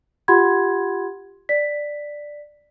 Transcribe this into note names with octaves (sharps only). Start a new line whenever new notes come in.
F4 G4 F#5 B5 C6 G#6
D5 B6